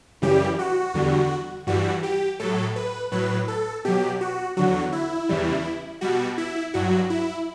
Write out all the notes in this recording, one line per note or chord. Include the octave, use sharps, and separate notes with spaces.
F#2 C#3 E3 G3 G4
F#4
E2 D3 G3
G2 E3 G3 F#4
G4
A2 F#3 A4
B4
A2 F#3 B4
A4
B2 F#3 G4
F#4
E2 D3 F#3 F#4
E4
E2 C#3 E3 G3
B2 G3 F#4
E4
G2 F#3 F#4
E4